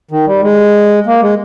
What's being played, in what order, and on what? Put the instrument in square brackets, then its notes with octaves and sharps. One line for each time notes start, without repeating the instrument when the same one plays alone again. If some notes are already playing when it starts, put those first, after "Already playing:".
[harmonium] D#3
G3
G#3
A#3
G#3